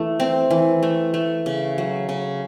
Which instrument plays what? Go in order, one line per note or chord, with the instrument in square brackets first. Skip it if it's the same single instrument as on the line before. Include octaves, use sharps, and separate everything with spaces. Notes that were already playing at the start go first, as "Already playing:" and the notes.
Already playing: [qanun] E3 A3
C4
E3
A3
A3
C#3
F#3
C#3